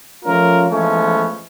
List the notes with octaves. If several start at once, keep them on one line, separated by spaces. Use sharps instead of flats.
F3 A3 C#4 F4 A#4
E3 F3 G#3 A3 B3 C#4